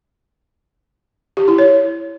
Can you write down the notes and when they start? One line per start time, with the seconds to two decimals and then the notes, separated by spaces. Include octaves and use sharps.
1.37 G4
1.48 E4
1.59 C#5